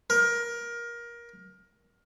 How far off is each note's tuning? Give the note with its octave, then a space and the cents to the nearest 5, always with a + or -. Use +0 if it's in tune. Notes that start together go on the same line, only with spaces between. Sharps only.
A#4 +20